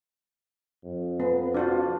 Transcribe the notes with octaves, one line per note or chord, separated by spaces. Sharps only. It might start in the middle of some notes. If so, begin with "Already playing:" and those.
F2
B3
D4 F4 F#4